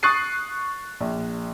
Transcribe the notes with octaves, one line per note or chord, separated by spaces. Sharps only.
C#6 D#6 F#6 A6 C7 D#7
A#1